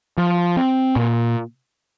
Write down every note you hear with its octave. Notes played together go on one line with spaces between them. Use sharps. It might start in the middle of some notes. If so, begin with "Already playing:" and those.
F3
C4
A#2